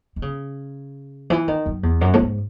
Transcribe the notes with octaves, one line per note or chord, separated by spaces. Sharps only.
D#3
C#3
E3
D#3
F#2
E2
F#2
A2
G#2